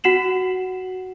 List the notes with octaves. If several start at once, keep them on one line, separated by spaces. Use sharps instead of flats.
F#4 F#5 C7 E7 F#7